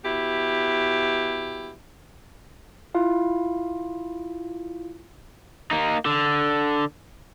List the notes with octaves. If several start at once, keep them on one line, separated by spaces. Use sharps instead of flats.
B2 E4 G4
E4 F4 F5
A#3 D#4
D3